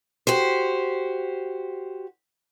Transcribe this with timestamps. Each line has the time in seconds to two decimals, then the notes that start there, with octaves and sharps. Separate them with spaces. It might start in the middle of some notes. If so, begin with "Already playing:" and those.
0.27 F#4 G4 C5